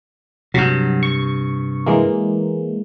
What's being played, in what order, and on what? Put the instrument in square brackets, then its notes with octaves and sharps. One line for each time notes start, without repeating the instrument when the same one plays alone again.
[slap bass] G2 C3 [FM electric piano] F#3 F#4
[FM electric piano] C#6
E3 G#3 A#3